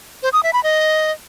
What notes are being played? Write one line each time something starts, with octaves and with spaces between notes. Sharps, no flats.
C5
D#6
E5
B5
D#5